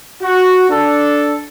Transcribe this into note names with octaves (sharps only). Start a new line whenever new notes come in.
F#4
D4 A4